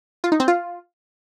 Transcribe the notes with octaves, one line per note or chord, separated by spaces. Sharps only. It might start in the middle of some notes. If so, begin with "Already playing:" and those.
F4
D#4
C4
F4